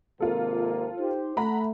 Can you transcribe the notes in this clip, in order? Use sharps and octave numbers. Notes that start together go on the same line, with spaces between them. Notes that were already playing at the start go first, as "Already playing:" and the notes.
G#1 C3 A#3 F4 A4
D#4 G4 C5
A3 F#5 A#5 B5